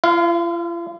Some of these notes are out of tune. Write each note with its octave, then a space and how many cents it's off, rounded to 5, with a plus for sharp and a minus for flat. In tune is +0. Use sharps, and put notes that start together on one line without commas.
F4 -45 F5 +0